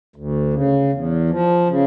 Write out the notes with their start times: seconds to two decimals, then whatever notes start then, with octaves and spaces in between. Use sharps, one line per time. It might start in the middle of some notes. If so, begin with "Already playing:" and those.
0.16 D2
0.53 C#3
0.92 E2
1.30 F3
1.69 C#3